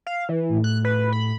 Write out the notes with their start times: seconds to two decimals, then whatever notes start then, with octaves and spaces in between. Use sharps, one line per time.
0.07 F5
0.29 E3
0.49 A2
0.64 F#6
0.85 B4
1.13 B5